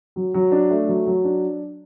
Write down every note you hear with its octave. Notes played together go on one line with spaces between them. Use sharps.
F#3
F#3
D4
A3
F#3
F#3
D4